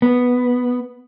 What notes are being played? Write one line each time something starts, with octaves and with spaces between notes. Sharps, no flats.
B3